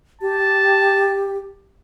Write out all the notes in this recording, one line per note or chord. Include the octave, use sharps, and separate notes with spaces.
G4 A5